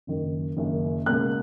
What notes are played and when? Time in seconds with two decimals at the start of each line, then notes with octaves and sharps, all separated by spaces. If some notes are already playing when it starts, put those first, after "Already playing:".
0.07 F#1 F#2 D#3
0.57 F#1 F#2 D#3
1.06 C#2 B2 A#3 F#6